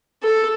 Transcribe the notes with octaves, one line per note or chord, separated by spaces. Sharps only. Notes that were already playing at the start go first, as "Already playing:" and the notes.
A4